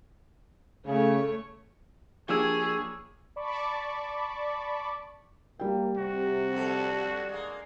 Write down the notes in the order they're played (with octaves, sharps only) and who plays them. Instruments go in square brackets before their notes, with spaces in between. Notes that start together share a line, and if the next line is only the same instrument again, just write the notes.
[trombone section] C#3 [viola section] A3 C#5
[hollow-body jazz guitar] F3 D4 [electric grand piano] A#3 G4 E6 [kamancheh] G#4 [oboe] C#5
[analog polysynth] D5 A5 B5 C#6 D6
[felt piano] G3 G5 [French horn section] A#3
[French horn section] C3 [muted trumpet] F#4
[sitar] F2 D3 A4
G#3 A#3